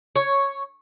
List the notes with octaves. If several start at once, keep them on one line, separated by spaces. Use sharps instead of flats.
C#5